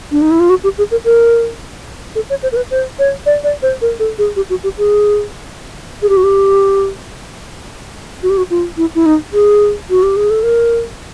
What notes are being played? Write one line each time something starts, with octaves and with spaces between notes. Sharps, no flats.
D4
D#4
E4
F4
F#4
G4
G#4
A#4
A#4
A4
C#5
C5
A#4
B4
C5
C#5
D5
D5
C5
A#4
A4
G#4
G4
F#4
G4
G#4
G#4
G4
F#4
G4
F#4
G4
F#4
F4
E4
E4
D#4
G#4
F#4
G4
G#4
A4
A#4